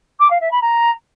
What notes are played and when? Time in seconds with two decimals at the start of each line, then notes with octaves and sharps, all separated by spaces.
0.19 D6
0.30 F5
0.40 E5
0.51 B5
0.61 A#5